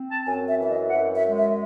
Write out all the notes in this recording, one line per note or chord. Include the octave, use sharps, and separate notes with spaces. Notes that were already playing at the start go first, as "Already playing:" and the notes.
Already playing: C4
A5
F#2 G#5
E5
E3 E5
D#5
F#5
F#2 E5
E5
G#3
E5